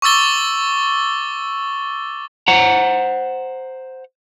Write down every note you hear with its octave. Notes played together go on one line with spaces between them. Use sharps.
C#6 D6 E6 A6 G7
C5 F#5 A#5